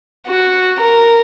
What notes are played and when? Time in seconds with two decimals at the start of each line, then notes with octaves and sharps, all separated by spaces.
0.27 F#4
0.80 A#4